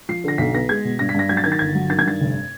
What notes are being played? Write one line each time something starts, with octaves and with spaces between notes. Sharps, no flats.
F3 C7
D3 A#6
B1 B6
B3 A#6
G#3 G#6
B2
G2 A#6
B6
G2 A#6
F#3 G#6
A6
D#3 G#6
A6
G1 G#6
F#3
D#3 A6
G#6
G2 A6
F1